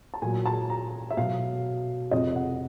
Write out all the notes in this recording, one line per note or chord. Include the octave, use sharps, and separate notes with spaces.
A5
A#2 F#3 G#5
A5
A#5
E5
B2 F#3 F5
F2 C3 F3 D#5
F#5